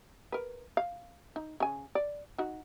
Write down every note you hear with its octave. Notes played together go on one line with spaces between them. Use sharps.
A#4 B4
F5
D#4
C#3 G#5
D5
D#4 F#4